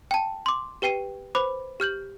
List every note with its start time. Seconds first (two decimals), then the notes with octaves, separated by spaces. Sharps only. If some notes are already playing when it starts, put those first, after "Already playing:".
0.11 G5 A5
0.46 C6 D6
0.82 G4 B4 G5 C7 D#7
1.35 B4 C5 B5 D6
1.80 G4 F6 G6 F#7